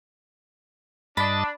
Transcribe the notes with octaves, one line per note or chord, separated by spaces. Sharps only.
G2 D4 D#5 B5 A6